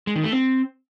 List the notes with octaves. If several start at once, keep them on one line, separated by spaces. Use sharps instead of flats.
G#3
D#3
A3
C4